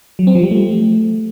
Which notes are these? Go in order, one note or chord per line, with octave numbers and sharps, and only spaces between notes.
F#3
C4
F3
G3
A3